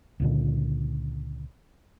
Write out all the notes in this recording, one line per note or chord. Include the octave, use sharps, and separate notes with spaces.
C#2 A#2 D3